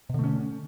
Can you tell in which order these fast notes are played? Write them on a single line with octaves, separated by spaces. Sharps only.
B2 D3 A3 C#4